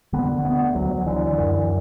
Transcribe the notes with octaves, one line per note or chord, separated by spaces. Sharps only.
D3 B3
D2 B3
D2 F#3
D3 E3
F#2 E3